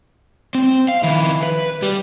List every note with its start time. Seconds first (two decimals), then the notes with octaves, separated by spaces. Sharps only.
0.55 C4
0.89 F5
1.03 D#3 E4
1.43 B4
1.82 G3